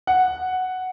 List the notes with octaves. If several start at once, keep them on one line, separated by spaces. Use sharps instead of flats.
F#5